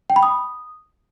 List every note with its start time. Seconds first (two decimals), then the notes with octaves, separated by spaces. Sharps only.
0.10 G5
0.16 B5
0.23 D#6